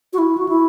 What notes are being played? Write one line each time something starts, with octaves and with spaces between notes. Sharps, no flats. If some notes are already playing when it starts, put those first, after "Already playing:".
F#4
E4
F#4
E4